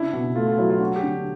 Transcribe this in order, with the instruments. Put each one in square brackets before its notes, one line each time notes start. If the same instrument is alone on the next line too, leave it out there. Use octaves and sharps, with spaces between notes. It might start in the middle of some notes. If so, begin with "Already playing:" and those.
Already playing: [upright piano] C#3 D4 [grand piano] E4
[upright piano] B2
[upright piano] A3 [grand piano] F4
[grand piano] F4
[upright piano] F#3 [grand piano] E4
[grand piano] F4
[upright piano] D4 [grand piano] F#4
[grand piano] G4
[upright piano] D3